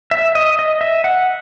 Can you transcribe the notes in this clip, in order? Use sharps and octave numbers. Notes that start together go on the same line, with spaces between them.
E5
D#5
D#5
E5
F#5